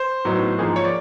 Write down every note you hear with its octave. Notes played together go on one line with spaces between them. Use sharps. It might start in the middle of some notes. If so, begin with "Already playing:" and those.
Already playing: C5
A2 F#3 B3 D#4
G#2 F3 A#3 D#4 G#4
C#5
D5